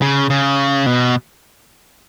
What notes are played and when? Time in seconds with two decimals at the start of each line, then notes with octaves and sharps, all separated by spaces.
0.02 C#3
0.30 C#3
0.86 B2